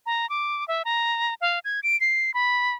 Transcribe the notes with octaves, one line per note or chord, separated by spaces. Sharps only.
A#5
D6
E5
A#5
F5
G#6
D7
C7
B5